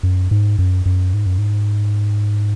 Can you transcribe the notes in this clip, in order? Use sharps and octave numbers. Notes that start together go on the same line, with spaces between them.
F#2
G#2
F#2
F#2
G#2
F#2
G#2